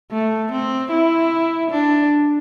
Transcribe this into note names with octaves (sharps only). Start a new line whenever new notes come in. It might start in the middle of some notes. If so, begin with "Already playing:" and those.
A3
C4
E4
D4